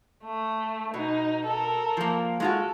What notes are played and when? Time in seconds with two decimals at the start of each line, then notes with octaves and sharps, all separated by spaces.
0.24 A3
0.94 B2 D#4
1.46 A4 A#4
1.97 F3 A#3
2.40 G#3 F4 F#4 A4